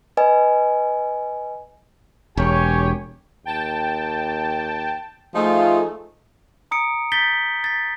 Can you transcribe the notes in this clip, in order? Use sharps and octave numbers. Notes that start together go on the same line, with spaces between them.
B4 D#5 G#5
E1 G4 C#5 G#5
D#2 G5 A5
F3 A3 D#4 F4 G#4
A#5 D#6 C#7 D7
G6 A6 B6 G7
A6 B6